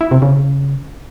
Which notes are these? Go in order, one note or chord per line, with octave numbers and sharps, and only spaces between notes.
E4
C3
C#3